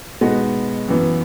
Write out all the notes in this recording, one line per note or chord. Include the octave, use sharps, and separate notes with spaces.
B2 G#3 B3 D#4 F#4
F#2 E3 B3